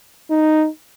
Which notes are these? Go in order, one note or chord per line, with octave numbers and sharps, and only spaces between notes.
D#4